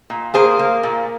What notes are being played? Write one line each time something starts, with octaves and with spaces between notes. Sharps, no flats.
A#2
A#3 G#4 C5
A#3
A#2